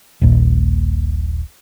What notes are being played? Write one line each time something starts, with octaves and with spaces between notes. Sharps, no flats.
D#1 A#1